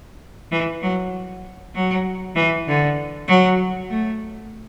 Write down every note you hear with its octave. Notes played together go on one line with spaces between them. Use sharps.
E3
F#3
F#3
E3
D3
F#3
A3